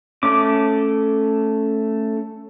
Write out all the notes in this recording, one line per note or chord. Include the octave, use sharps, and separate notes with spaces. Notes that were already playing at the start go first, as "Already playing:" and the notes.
A3 C#4 D6